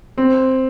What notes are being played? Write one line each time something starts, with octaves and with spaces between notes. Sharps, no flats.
C4